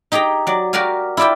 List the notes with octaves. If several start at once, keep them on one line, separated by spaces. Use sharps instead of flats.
D#4 G4 G#4 G5 A#5
F#3 D5
F#4 G4 A#4 D5 F5 G#5
E4 F4 D5 E5 G5